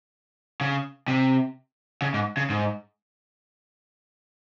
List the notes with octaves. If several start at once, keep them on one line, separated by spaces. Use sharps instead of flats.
C#3
C3
C#3
G#2
C#3
G#2